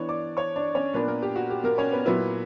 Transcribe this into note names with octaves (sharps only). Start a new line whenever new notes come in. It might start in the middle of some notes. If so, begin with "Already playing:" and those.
Already playing: E3 B3 D4 C#5 C#6
D5 D6
C#5 C#6
D4 D5
C#4 C#5
A#2 A#3 B3 D4 B4
A#3 A#4
G4
F#4
G4
A#3 A#4
C#4 C#5
B3 B4
A#2 F#3 B3 E4 B4